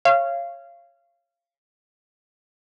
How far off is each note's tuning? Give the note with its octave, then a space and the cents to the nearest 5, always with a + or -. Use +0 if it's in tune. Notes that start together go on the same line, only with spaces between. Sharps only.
C#5 -15 F5 -25